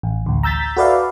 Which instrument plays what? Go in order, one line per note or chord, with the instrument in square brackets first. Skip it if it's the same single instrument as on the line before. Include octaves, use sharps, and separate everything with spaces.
[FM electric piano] A1
A1 D2
A#5 E6 G6 A6 B6
F#4 A4 B4 D5 E5 F5